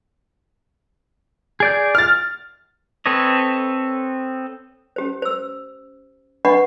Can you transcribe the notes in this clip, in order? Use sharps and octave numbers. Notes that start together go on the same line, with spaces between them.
G#4 D5 G6
F6 A6
C4 A4 B4 C#5 D#5
C#4 G4 C5
C5 E6
D4 B4 D#5 F#5 B5 C#6